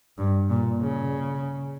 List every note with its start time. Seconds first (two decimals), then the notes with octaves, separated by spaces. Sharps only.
0.18 G2
0.50 A#2
0.81 C#3